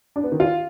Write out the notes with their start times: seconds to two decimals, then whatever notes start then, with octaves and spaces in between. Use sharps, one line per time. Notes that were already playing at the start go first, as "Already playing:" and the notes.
0.16 D4
0.24 B3
0.32 D#3
0.40 F4